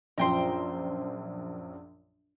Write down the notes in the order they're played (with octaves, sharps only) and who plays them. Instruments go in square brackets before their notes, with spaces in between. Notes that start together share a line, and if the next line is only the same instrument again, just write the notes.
[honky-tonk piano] A#1 F#2 F3 [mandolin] C5 G5 A#5